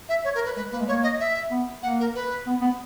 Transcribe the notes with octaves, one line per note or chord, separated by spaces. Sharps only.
E5
C#5
A#4
B4
G#3 B4
A#3 B4
G#3
A#3 C#5
D#5
E5
B3
A#3 F#5
A#4
B4
B3
B3